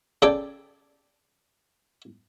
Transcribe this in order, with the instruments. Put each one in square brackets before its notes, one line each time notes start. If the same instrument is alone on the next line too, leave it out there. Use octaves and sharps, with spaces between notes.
[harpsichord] C#3 A4 D5 G5